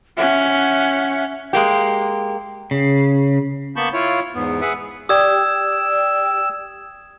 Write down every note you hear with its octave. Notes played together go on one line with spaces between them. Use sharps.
C#4 E5 F#5
G#3 A#3 G4
C#3
A#3 B3 A5 B5 C#6 G6
E4 F4 C#5
E2 G#2 B3
G#4 B4 E5 F#5
G4 D5 G5 D#6 E6 G#6